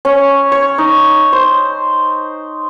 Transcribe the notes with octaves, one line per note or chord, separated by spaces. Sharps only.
C#4
C#5
D#4
C5